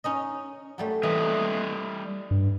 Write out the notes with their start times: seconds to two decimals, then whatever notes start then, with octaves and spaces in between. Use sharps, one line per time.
0.04 C#4 D#4 D#5
0.78 F#3 G3 A3
1.03 E3 G3 D#5 E5
2.31 G2